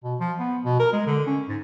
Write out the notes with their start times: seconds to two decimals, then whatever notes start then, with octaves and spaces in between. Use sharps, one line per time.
0.04 B2
0.20 F3
0.39 B3
0.64 B2
0.79 A#4
0.93 G#3
1.06 D3
1.27 C#4
1.48 G#2